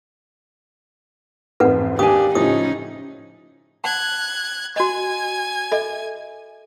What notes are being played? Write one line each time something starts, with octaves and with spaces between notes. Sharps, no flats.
A1 F2 G#2 A4 B4 F#5
D#2 D4 G4 G#5 D#6
A2 C#3 F3 C#4 D#4 D#6
F#5 A5 F#6 G#6
F#4 D#5 G#5 G#6
A4 D#5 E5